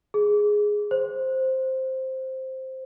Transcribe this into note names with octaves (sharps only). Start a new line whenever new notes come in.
G#4
C5